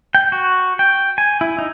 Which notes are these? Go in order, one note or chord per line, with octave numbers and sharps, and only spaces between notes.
G5
F#4
G5
G#5
E4
D#4